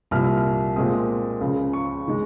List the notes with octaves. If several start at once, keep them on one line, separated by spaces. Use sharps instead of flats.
C2 A#2 F3 F6
A#2 G#3 C4 D#6
C#2 C#3 F3
C#6
D#3 G#3